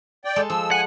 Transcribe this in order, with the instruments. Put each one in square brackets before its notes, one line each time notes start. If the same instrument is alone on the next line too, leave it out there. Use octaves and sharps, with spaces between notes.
[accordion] D5 G5
[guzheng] G#3 A4
[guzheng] F3 [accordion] E6
[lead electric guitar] F#5 [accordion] G#5